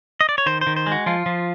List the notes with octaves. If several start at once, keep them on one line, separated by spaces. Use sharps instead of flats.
D#5
D5
C#5
D#3 C5
C5
D#3
C5
G#3
F#4
F3 F4
F3